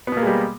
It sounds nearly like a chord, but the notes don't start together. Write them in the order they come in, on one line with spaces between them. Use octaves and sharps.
B3 B2 A#3 G#3 G3